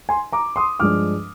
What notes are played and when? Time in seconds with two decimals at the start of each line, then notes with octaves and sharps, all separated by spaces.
0.09 G#5 C6
0.33 A#5 D6
0.56 C6 D#6
0.80 G2 F3 G#3 D4 D6 F6